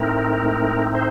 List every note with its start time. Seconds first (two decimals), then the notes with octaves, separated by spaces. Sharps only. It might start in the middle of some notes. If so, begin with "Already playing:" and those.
Already playing: A2 A3 C4 D#4 A#4
0.95 C5